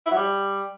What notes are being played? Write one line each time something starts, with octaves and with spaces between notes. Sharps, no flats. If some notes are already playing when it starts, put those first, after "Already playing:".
E4
F#3
G3